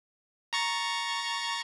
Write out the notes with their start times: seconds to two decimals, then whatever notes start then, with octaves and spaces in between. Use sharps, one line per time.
0.53 A#5 C#6 A6